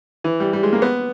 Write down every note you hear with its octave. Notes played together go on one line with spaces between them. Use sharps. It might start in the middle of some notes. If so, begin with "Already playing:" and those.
E3
G3
G3
G#3
A#3
B3